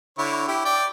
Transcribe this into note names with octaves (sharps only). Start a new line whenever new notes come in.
D3 E4 C#5
E4 G4
D5 G5